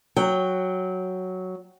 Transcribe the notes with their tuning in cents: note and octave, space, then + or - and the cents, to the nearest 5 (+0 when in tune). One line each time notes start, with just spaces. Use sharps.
F#3 +0 G5 +0